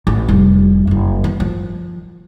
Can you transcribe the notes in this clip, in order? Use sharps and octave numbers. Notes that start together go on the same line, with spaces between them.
A1
F1 G3
F#1 E4
E3
F3